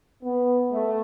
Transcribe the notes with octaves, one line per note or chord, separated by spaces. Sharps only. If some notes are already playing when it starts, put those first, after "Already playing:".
B3
A3